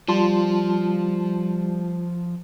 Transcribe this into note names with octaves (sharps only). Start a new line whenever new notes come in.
F3 G3 F4 A5 C6